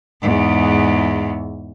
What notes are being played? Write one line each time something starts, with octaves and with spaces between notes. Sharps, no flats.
E2 G#2